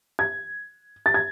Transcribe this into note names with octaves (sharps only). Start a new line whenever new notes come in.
G#6
A6
G#6